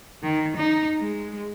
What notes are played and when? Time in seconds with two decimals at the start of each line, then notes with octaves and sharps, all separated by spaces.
0.23 D#3
0.56 D#4
1.00 G#3